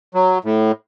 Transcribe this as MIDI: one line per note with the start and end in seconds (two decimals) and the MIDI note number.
0.15 0.38 54
0.44 0.72 45